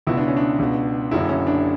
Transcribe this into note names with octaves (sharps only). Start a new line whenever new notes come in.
C#2 B2 E4
D4
C#4
D4
C#2 B2
F#1 F#2 D3 E4
C#4
D4